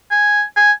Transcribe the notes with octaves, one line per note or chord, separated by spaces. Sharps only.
G#5
G#5